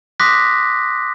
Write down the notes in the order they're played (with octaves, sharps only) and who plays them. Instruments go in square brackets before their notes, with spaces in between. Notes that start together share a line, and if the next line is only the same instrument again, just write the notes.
[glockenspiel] C6 D6 D#6 F#6 A#6 B6